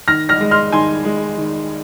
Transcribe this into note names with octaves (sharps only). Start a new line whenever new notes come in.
D#3 F6 A#6
F6 A#6
G#3
C6 F6
D#3 G#5 C6
G#3
D#3